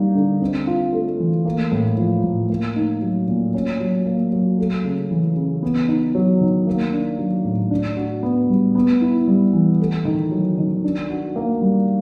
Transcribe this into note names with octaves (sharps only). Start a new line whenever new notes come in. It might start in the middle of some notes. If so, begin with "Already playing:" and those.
Already playing: G3 A#3 D#4
D3
C4
F4
A3
E3
A#3
A2
F3
A2
A#3
D#4
F#3
A#2
C#4
F#3
A#3
F#3
A3
C#3
E3
C#3
B3
D#4
F#3
D#3
A#3
D4
F#3
A2
D4
F#4
B3
G3
B3
E4
G3
E3
A3
D#3
F#3
D#3
D4
F#4
A#3
G3